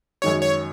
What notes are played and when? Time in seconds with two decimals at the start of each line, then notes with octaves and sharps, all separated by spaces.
0.22 F#2 D#3 G#3 D#4 F#4 C#5
0.42 C#5